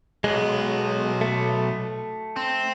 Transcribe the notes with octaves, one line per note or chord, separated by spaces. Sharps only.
B1 G#3 B3
A3
C4